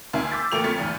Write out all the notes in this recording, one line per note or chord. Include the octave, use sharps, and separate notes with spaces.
C#2 D#3 E5 G#5 C7
D6 E6 G6 A6 B6
A1 A3 A#3 G5 C7 F7
F2 A3 F6 A6 B6 C#7
A1 E2 G#2